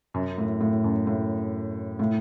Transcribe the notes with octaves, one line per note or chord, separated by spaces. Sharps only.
F#2
A2
A2
F#2
A2
A2